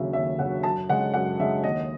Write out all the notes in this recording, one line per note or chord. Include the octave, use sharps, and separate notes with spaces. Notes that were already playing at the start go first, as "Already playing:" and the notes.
Already playing: D#2 C#3 F#3 E5
D#2 E5
C#3 F#3 F#5
F#2 A5
C#3 G#3 F#5
F#2 F#5
C#3 G#3 E5
D#2 D#5